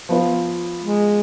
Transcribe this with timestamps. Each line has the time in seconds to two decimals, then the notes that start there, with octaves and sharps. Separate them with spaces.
0.09 F3 B3 F4
0.82 G#3